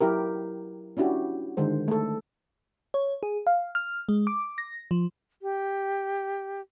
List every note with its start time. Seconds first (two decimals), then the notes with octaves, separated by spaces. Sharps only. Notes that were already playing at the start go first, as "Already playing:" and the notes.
0.01 F#3 E4 G4 A#4
0.97 C#4 D4 E4 F#4 G4
1.57 D3 D#3 G#3 C5
1.88 A3 A4
2.94 C#5
3.23 G#4
3.47 F5
3.75 F6
4.09 G#3
4.27 D6
4.58 A#6
4.91 F3
5.42 G4